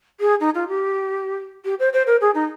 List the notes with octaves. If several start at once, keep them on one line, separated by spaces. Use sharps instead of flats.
G#4
D#4
F4
G4
G4
C5
C5
A#4
G#4
D#4